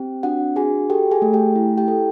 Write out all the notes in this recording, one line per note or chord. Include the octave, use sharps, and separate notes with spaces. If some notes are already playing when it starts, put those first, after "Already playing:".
Already playing: C4 G4 G5
D4 F#4 F#5
F#4 G#4 G#5
G4 A4 G5
G#4 G#5
A3
G4 G5
E4
G4 G5
A4